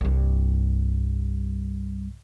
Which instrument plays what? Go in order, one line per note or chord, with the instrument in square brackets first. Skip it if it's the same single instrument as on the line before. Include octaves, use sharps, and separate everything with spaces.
[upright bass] C2 G2